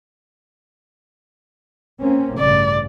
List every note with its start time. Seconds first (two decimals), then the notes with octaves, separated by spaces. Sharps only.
2.01 A#3 C4 C#4
2.39 A1 G2 C#3 D5